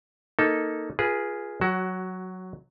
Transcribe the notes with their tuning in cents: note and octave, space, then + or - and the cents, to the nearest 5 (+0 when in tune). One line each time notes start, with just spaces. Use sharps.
A#3 +0 D#4 +10 A4 +0
F4 +0 G#4 +0 B4 -30
F#3 +0 F#4 +20